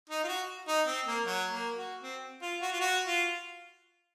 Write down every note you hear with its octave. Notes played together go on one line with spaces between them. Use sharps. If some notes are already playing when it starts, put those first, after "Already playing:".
D#4
F4
F#4
D#4
C4
A#3
F#3
A#3
F#4
C4
F4
F#4
F4
F#4
F4